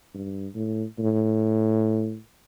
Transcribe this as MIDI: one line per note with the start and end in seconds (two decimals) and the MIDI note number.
0.15 0.48 43
0.55 0.84 45
0.99 2.18 45